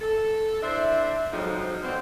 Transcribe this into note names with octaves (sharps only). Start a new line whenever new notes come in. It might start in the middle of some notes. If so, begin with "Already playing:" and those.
A4
D4 E4 C5 E5
F2 G#2 F3 F#3 D#4
B2 D3 C4